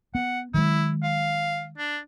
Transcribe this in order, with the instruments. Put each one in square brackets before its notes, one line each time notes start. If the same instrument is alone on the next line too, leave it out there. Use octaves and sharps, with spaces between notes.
[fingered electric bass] B3 [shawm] F#5
[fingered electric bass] D#3 F#3 G#3 [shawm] E4
[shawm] F5
D4